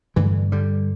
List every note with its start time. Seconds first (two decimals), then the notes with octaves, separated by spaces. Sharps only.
0.16 G2 D3 E3 A3
0.52 D3 G3